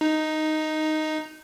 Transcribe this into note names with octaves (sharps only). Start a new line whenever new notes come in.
D#4